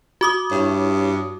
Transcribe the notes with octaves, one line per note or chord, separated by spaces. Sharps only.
F#4 D6 D#6
G2 E4 C#5